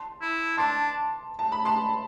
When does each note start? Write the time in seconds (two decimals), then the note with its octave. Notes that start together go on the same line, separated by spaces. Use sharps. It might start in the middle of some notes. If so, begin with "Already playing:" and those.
Already playing: A5 C6
0.21 E4
0.57 D4 A5 C6
1.39 A5
1.52 B5
1.65 A5 C6